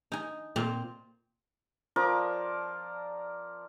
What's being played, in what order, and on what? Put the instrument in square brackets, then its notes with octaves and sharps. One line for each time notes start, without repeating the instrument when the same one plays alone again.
[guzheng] D#4 G#5
A#2 C4 A#5
[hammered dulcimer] F3 A#4 D5 D6